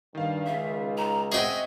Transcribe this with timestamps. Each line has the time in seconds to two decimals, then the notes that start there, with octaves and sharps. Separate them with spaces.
0.15 G2 D#3 F5
0.46 C#2 E5
0.97 A#5
1.32 C4 F#4 G#4 D#5 E5 G5